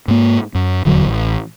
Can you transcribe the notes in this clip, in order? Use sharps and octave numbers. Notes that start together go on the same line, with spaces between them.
G#2 A#3
F#2
D#1 E2 D3 F#3
A1